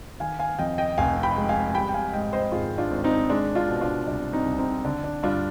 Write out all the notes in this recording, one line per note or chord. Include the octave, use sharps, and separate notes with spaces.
D#3 F5 G#5
F5 G#5
F2 D#5 G5
D#5 G5
F1 F5 G#5
G5 B5
G#3
F5 G#5
G#5
G3 G5 B5
G5
F5 G#5
G#2 D#5 G5
C5 D#5
G#1 F4 G#4
D4 F4
G#1
C4 D#4
G#3 D4
D4 F4
B2
D4 F4
C2 D4
C4 D#4
C2
C4 D#4
D3 D4
D4
G2 D4 F4